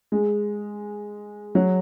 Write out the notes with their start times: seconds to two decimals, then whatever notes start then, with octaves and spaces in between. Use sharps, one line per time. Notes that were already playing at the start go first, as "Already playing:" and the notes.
0.12 G#3
1.55 F#3